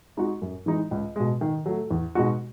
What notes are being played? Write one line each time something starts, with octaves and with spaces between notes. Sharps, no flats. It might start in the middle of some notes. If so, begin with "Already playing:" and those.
G#3 D#4 F#4
F#2
E3 G#3 D#4
C#2
B2 G#3
D#3
F#3 A3
E2
B2 G#3 D#4 F#4